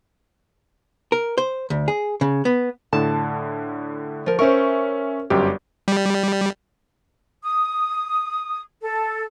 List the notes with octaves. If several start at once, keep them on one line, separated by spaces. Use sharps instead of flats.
A#4
C5
D2
G#4
C#3
B3
A2 D3 A5
F3 A#4
C#4 A#4 C5 E5 C#6
G1 F#2 G3 G4
G3
D#6
A4